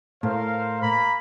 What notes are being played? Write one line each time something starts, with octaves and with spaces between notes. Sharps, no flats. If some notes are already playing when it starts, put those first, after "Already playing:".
A2 A#4 C5 F5
A#3 A#5 B5